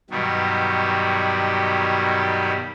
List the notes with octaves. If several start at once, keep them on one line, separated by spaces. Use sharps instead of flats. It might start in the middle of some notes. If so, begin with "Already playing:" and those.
G2 B2 D#3 F#3 G3